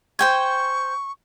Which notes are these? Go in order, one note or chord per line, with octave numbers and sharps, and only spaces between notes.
C5 G5 G#5 C#6